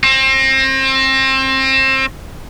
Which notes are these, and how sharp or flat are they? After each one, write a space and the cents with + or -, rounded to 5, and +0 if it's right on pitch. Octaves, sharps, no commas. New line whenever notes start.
C4 +30